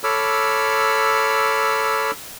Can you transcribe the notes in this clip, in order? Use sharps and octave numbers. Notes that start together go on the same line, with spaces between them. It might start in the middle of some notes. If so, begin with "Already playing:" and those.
A4 C#5 B5 D6 E6 F6